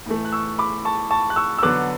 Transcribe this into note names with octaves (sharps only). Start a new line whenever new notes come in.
A2 E3 A3
F#6
C#6 E6
B5 D6
A5 C#6
A5 C#6
F#6
C#6 E6
E6
D3 F#3 B3 D6 F#6